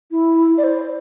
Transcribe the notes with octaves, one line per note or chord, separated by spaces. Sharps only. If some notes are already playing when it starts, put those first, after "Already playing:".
E4
D5
C5